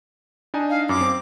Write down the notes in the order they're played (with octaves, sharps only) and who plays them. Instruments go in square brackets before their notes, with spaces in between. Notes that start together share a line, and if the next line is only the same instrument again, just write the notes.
[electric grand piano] D4 D#4 G#5
[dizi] F5
[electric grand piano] F#2 [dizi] D6
[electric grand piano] C4